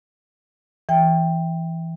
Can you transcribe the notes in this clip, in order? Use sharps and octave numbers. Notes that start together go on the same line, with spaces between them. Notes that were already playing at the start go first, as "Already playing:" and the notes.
E3 G5